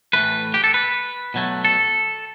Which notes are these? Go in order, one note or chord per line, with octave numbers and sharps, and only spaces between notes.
A2 E3 A3 B4
G4
A4
B4
B2 F#3 A3
A4